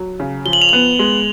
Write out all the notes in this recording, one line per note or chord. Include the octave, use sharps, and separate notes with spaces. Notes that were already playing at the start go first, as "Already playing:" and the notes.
Already playing: F#3
C#3
F3 G7
F#7
F7
B3 F#7
G#3